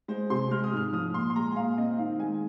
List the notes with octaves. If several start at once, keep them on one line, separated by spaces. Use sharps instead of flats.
G#3 C5
C3 C6
G#3 F6
D#6
G#2 F6
F3 D#6
A#2 C6
C6
G#3 A#5
G#5
A#2 F5
C4 D#5
D#3 F5
G#3 G#5